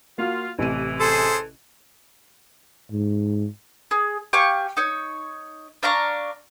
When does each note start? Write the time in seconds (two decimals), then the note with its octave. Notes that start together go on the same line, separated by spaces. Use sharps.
0.18 A#3 F4 F#4
0.59 A1 A2 C3 E3 D#7
1.00 G#4 A4 C5
2.92 G#2
3.91 G#4
4.33 G4 F5 G#5 C#6
4.77 D#4 C#5
5.83 D4 F5 A#5 C#6